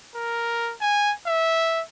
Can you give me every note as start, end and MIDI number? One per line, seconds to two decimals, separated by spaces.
0.15 0.73 70
0.81 1.13 80
1.27 1.81 76